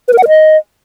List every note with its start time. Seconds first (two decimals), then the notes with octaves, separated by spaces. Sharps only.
0.08 B4
0.13 A#4
0.18 F#5
0.23 A#4
0.28 D#5